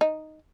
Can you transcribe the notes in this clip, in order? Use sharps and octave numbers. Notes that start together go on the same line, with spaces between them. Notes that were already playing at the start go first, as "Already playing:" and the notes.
D#4